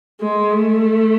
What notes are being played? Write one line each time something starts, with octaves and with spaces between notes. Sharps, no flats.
G#3
A3